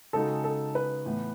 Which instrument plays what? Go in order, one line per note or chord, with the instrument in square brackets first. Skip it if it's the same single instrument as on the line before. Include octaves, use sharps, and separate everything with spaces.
[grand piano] C#3 G#3 D#4 F#4 [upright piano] A4
[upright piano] A4
B4
[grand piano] A2 E3 B3